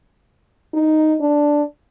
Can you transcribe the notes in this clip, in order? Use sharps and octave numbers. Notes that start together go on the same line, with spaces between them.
D#4
D4